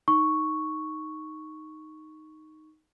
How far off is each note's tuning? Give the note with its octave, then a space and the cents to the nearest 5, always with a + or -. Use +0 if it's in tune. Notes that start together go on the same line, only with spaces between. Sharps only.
D#4 +0 C#6 +0